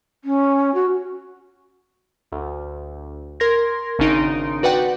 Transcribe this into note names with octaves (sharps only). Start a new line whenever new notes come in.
C#4
F#4
D2
A#4 C6 G#6 A#6
G#1 C#3 D4 D#4 C6 D7
F#4 B4 D5 F#5 G5